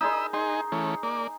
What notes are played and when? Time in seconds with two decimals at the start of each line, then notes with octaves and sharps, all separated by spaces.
0.01 D#4 G#4 D#5 B5 C6 E6
0.33 D#4 G#4 C6
0.72 E3 A3 C#4
1.03 A#3 D5